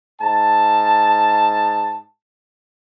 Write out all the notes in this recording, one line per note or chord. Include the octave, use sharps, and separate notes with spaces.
G#2 A5